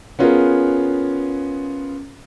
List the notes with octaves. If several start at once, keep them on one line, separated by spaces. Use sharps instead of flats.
B3 C#4 F4 G#4 A#4